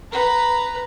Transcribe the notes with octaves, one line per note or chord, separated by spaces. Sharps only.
B4 A#5